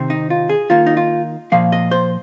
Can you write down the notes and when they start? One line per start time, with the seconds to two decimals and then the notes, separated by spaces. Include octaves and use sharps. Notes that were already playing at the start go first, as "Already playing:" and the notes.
Already playing: C3 D#3 C4
0.10 D#4
0.30 F4
0.49 G#4
0.70 D#3 A#3 F4
0.86 D#4
0.97 F4
1.52 A#2 F3 A#3 F5
1.72 D#5
1.91 C5